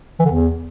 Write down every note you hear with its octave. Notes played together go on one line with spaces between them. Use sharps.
E3
D3
E2